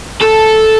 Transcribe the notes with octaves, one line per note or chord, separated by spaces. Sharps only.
A4